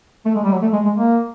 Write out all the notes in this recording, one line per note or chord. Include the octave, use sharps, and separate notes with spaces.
A3
G#3
G3
F#3
A3
G#3
G#3
A#3